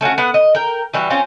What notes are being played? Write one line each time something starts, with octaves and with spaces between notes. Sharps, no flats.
A3 C#4 F4 F#4
B3 F#5
D#5
A#4 G5
E3 G3 F#4
C4 C#4 F4 C5